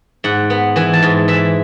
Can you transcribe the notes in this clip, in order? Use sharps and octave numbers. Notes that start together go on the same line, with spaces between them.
G#2 F#5
B3
E3 G#5
A5
G#2
E3 E5